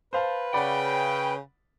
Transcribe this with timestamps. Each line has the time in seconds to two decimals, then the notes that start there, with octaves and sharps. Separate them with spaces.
0.13 B4 C5 F5 A5
0.54 C#3 D5 F#5 G5 B5